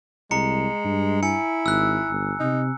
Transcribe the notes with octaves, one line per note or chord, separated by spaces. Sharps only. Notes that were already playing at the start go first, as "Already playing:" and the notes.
C2 G#3 A#5 C#7
G2
E4 G#5 C#7
G#1 E6 F#6
G1
C3 D#4